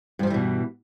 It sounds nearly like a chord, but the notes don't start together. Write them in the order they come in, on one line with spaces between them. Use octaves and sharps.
G2 F3 G3 E3 B2